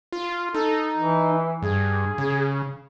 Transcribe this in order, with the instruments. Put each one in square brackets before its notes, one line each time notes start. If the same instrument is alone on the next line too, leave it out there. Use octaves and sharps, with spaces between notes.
[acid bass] F4
[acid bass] D#4 [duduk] A4
[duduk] E3
[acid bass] G2 [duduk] G#4
[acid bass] C#3